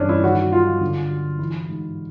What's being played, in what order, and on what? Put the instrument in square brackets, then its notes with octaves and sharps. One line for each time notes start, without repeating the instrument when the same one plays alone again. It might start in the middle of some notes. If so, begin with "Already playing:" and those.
Already playing: [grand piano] G2 E3 C#4 D4
E4
D#3 F#4
F#3 F4
D3
F#3
E3 E4
G#2